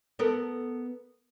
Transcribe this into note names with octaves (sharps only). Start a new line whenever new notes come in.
B3 A4 A#4